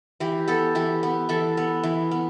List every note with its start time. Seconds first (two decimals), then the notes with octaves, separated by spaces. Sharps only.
0.20 E3 G4
0.48 B3 A4
0.75 E3 G4
1.03 B3
1.29 E3 A4
1.57 B3
1.83 E3
2.11 B3